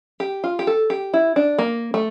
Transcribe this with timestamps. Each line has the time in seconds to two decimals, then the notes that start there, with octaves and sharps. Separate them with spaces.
0.20 G4
0.44 F4
0.59 G4
0.67 A4
0.90 G4
1.14 E4
1.36 D4
1.59 A#3
1.94 A3